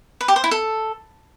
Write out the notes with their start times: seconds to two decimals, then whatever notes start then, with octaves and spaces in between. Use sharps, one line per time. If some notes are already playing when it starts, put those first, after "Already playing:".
0.21 B4
0.28 G4
0.36 C5
0.44 E4
0.51 A4